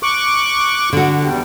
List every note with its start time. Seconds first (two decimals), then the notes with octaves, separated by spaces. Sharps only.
0.03 C#6 D6 F#6
0.93 D3 F#4
1.21 E2 G3